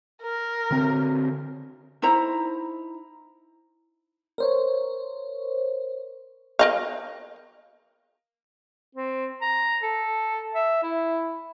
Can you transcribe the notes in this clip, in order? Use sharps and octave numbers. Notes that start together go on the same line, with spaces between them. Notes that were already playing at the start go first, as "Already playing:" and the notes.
A#4
D3 C4
D#4 E4 C5 A#5
A#4 C5 C#5
A#4 D#5 F5
C4
A#5
A4
E5
E4